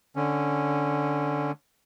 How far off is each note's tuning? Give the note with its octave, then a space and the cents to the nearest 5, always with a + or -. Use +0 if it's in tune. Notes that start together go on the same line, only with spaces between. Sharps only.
D3 +0 C#4 -5